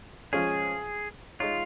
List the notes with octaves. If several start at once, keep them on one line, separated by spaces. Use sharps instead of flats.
F3 G#3 C#4 G#4
G#3 D#4 F4 C#5